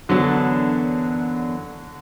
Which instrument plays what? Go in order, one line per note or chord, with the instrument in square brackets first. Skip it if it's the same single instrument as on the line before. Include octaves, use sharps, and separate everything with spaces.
[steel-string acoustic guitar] F#2 E3 B3 D4 A4 [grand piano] D3 F#3